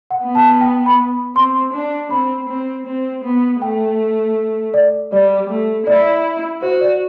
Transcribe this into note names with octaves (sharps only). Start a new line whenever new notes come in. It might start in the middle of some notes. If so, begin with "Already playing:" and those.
F#5
B3
A5
G5
B5
C4 C6
D4
C4 B5
C4
C4
B3
A3 G5
D5
G3 D5
A3
E4 D5
F#4 C5
D5